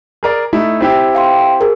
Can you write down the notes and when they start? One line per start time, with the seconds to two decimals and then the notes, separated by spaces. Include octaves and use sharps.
0.23 G#4 A#4 D5
0.53 A3 D#4 E4
0.81 C4 E4 G4
1.15 F5 G5 C6
1.61 G#4 A#4